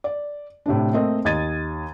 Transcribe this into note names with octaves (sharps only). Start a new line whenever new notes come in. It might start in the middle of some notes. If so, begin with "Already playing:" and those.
D5
A2 C3 A3 D4
A3 A#3 C4 D#5
D#2 D#5 G#6 A6 D#7